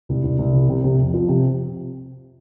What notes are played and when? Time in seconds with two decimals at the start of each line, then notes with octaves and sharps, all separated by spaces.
0.09 C2
0.23 C2
0.39 C2
0.53 C3
0.69 C3
0.84 C3
0.99 F2
1.14 F3
1.28 C3